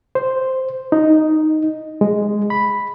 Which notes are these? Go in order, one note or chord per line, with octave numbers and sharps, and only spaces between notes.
C5
D#4
G#3
B5